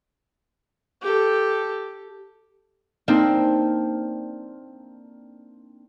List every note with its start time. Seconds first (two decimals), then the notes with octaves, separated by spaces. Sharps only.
1.01 G4 A4
3.08 A#3 C4 D4 D#4